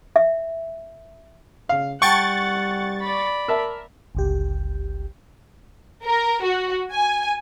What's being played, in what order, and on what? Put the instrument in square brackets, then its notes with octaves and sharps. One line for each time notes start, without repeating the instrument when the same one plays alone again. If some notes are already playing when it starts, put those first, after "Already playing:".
[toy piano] E5
[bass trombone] C#3 [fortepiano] F5
[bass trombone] G3 [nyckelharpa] F#5 [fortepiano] G5 A5 [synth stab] C#6 A6
[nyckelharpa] D5 B5
[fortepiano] A#4 E5 A5
[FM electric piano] G1 C#2 G4
[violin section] A#4
F#4
G#5